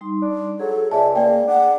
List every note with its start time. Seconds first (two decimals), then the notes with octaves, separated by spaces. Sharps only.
0.01 G3 D#4 C6
0.22 D4
0.60 F#3 G#4 A4
0.91 C#2 G#4 D5 E5 G#5 A5
1.16 A#3 G#4 D5 G5
1.47 D4 F#5